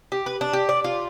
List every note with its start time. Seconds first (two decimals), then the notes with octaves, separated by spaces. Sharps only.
0.12 G4
0.26 B4
0.41 D4
0.53 G4
0.69 D5
0.84 F4